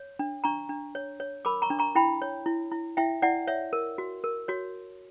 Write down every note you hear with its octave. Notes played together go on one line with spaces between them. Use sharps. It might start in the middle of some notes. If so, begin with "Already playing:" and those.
Already playing: C#5
D4
D4 A#5 C#6
D4
C#5
C#5
A#4 B5 D6
A#5 C#6
D4
A#5 C#6
E4 G5 B5
C#5
E4
E4
E4 E5 G5
E4 D5 F#5
C#5 E5
A#4
F#4
A#4
F#4 C#5